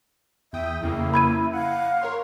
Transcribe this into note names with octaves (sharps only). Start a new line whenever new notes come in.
E2 E5 G5 D#6
F2 C#3 A#3 E4
B5 G#6 D#7
F5 F#5
A#4 C#5 C6